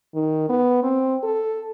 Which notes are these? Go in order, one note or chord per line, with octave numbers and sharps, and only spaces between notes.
D#3
B3
C4
A4